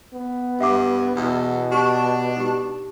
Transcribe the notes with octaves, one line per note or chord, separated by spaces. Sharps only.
B3
G2 E5 F#5 D6
E2 B2
D4 G4 C#6
D#4 G4